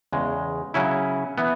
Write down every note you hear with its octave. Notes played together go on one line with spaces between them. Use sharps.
E2 C#3 G#3
C#3 F#3 C#4 E4
E3 B3